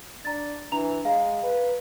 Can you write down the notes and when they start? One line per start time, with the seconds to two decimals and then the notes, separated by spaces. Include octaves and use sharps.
0.25 D4 A#5 A6
0.72 E3 D4 A#5 F7
1.05 G#3 F5 A#5
1.43 B4